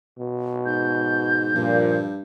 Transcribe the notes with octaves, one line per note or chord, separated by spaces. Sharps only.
B2
G#2 G6
G2 A#2 F3